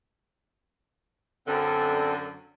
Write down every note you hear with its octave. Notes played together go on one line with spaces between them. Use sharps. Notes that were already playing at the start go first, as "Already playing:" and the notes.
F#2 D3 C4 A4